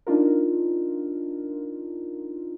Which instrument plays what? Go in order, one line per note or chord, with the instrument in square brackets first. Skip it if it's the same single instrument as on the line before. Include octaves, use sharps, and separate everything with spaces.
[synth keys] D4 D#4 F4 A#4